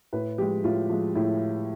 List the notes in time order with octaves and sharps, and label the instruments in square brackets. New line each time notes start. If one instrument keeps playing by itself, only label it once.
[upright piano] A2 B4
F3 G4
G#3
A2 F4
F3 G#3
A2 E4